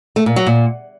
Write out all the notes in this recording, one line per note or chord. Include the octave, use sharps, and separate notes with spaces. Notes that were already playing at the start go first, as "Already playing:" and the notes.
A3
A#2
F#3
A#2